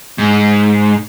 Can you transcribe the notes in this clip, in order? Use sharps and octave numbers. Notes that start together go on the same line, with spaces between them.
G#2